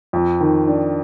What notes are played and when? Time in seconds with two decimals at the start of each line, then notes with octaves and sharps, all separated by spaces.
0.13 F2
0.40 D#3
0.67 D4